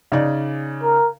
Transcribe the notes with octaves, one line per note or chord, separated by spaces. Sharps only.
C#3 D#4 D5
A#4